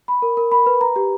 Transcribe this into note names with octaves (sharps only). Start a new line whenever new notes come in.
B5
A#4
A#4
B5
B4
A#5
G4